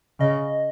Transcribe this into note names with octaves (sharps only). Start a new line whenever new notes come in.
C#3 D#5